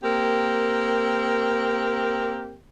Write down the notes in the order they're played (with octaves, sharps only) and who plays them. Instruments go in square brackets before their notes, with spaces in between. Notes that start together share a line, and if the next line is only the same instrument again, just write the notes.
[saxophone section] A#3 C4 G4 A#4